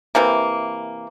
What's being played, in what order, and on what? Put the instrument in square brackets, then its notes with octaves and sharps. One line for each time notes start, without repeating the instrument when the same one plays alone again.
[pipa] C3 E3 A#3